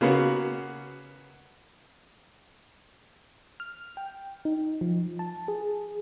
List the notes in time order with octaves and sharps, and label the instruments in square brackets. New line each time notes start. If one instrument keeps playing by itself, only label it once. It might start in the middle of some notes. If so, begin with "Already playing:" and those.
[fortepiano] C#3 A#3 B3 C#4 F#4
[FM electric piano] F6
G5
D#4
F3
A5
G#4